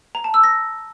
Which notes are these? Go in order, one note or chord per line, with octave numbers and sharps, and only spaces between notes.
A#5
A5
E6
A#6